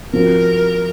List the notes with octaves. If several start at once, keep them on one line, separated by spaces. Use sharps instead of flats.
F3 C4 F#4 A#4